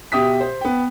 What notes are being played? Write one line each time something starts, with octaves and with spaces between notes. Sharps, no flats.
B2 G4 E5 D#6 B6
C5
B3 G5